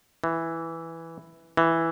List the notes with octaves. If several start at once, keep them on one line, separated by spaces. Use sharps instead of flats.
E3
E3